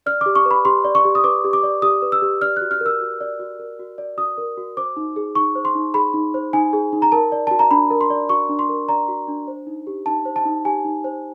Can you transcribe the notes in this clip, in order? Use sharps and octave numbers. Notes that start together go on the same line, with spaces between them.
D5 F6
D6
G4
C#6
B4
B5
G4 C6
D5
C#6
G4
D#6
B4 D6
G4
D6
D5
G4 D#6
B4
E6
G4
D5 F6
F#6
F#4
F6
A#4
E6
F#4
D5
F#4
A#4
F#4
D5
F#4 D#6
A#4
F#4
C5 D6
D#4
G#4
D#4 C#6
C5
C6
D#4
G#4 B5
D#4
C5
D#4 G#5
G#4
D#4
A#5
A#4 A5
D5
F#4 A5
A#5
D4 B5
A#4
C6
D5
F#4 C#6
D4
C6
A#4
D5 A#5
F#4
D4
C5
D#4
G4
D#4 A5
C5
A5
D#4
G4 G#5
D#4
C5